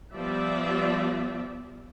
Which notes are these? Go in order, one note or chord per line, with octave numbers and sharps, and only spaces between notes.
F3 G3 B3 D5 E5